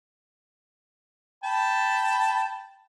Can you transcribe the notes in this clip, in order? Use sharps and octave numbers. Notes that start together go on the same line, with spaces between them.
G5 A5 B5